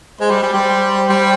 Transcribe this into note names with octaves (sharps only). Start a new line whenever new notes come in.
G#3 C5
G3
G3
G3
C5
G3